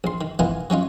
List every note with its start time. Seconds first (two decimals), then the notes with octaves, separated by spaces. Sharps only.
0.04 A#1 C6
0.21 D#3
0.39 E3 B3 D#4 F4 A#4 G#5
0.70 F#3 C#4 D#4 F4